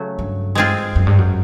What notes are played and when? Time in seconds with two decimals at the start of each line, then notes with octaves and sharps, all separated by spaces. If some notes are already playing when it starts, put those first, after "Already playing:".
Already playing: C#3 F#3 A3
0.19 G2
0.55 G#3 C4 F4 G#4
0.96 F#2
1.07 G2
1.18 F#2